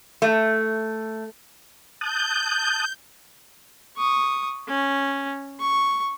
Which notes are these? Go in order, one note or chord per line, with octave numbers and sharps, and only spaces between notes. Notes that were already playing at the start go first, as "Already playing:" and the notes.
A3
A5 D#6 F#6 G6
C#6 D#6
C#4
C#6